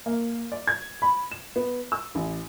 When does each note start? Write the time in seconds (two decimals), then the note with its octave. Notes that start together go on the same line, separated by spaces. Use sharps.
0.06 A#3
0.52 D5
0.68 G#6
1.02 B5
1.32 E7
1.56 B3
1.92 E6
2.15 A1